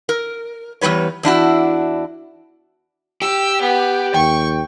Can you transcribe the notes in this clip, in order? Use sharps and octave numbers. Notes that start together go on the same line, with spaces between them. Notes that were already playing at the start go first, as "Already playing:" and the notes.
A#4
E2 E3 G3 B4 C#5
E2 D4 E4 F#4
G4 E6
B3
D#2 G5 C#6